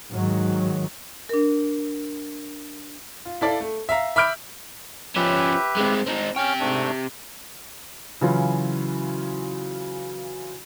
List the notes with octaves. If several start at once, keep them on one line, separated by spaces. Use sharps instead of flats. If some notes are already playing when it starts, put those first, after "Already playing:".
G#2 D#3 F#3
D4 A#4
F4
E4 A4 D5 F5
A3
E5 F5 A#5
E5 B5 D6 F6 G6 D7
F3 C#4 G4 B4 E5
G#3 C4
C4 D#4
C3 C#4 G5 C#6 F6
G#2 A3 D4
C#3 E3 F#3 C#4 E4 F4